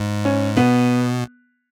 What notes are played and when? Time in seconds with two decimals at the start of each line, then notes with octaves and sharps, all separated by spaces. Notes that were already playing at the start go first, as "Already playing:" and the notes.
Already playing: G#2
0.25 C#4
0.56 B2 B3